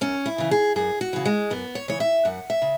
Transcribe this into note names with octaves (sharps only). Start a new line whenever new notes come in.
F#2 C#4
E4
C#3 E3
G#4
F#2 G#4
F#4
C#3 E3
G#3
F#2 B3
C#5
C#3 E3 C#5
E5
F#2 F#5
E5
C#3